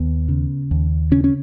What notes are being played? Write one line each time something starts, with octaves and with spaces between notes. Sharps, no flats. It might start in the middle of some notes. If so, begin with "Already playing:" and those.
Already playing: D#2 B3
C#3
D#2
C#3 C#4
C#4